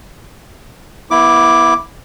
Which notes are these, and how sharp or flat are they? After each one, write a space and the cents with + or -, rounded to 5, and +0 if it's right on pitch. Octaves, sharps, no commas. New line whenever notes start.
B3 -30 E4 +0 D6 +0